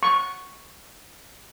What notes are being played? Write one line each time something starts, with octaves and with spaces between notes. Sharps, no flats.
C#6